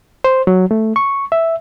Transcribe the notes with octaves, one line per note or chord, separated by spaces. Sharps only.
C5
F#3
A3
C#6
E5